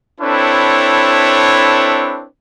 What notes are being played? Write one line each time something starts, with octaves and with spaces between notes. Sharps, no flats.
C4 D4 E4 A4 B4 C#5